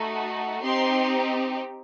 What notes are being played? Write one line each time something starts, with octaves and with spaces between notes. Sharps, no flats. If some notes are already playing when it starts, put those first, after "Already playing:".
Already playing: A3 D#4 F#4
C4 D#4 G4 C6